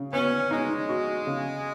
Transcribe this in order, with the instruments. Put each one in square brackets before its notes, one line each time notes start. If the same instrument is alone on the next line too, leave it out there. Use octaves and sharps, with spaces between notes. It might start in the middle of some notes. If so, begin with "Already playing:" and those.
Already playing: [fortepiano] C#3
[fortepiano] B3 [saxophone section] C#4
[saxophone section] G#3 [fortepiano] D#4
[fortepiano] F#4
C#3